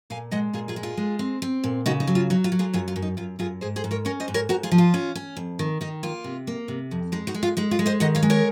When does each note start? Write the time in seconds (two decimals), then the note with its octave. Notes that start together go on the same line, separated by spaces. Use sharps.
0.10 A#2 F5 G#5
0.31 G#3 D#5 F#5
0.53 A#2 F4 G#4
0.68 F4 G#4
0.76 G#3
0.83 F4 G#4
0.97 G#3
1.19 C4
1.42 C4
1.64 A#2
1.86 C#3 D#4 F#4
2.00 D#4
2.07 F#3
2.15 F4
2.30 F#3 D#4
2.44 F4
2.52 F#3
2.59 F4 G#4
2.74 F#2 F4 G#4
2.88 F4
2.96 F#2
3.02 D#4
3.17 F#2 F4
3.39 F#2 F4 G#4
3.61 G#2 G#4 C5
3.76 G#4 C5
3.84 G#2
3.91 A#4 C#5
4.05 C#4 A#4 C#5
4.20 C5 D#5
4.28 G#2
4.34 A#4 C#5
4.49 G#2 F#4 A#4
4.63 F4 G#4
4.72 F3
4.78 F4
4.94 C#4
5.15 C#4
5.37 F2
5.59 D#3
5.81 D#3 D#4
6.03 A#3 F4
6.24 C3
6.47 A#3
6.68 C3
6.91 F2
7.12 G#3 D#4
7.27 D#4 F#4
7.34 G#3
7.43 F4
7.57 G#3 D#4
7.71 F4
7.79 G#3
7.86 C5 D#5
8.00 D#3 D#5 F#5
8.15 C#5 F5
8.23 G#3
8.30 A#4 C#5